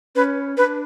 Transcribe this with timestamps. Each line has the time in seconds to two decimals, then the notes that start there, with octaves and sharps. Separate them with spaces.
0.15 C#4 B4
0.57 D4 B4